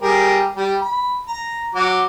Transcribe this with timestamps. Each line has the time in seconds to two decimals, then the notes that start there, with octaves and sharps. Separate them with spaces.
0.02 G3 G#4 A#4
0.56 G3
0.81 B5
1.26 A#5
1.75 F#3 D6